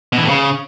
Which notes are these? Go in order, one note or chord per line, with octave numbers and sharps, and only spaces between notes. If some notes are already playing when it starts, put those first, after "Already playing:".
B2
E3
A2
C#3